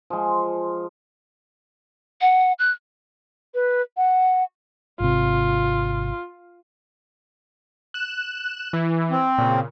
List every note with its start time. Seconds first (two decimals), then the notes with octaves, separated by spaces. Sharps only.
0.10 F3 G#3
2.21 F#5
2.59 F#6
3.55 B4
3.97 F#5
5.00 G#1 C3 F4
7.94 F#6 E7
8.73 E3
9.11 C4
9.38 A#2 C#3